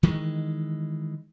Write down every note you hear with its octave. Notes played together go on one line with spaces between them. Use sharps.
D#3 E3 G#3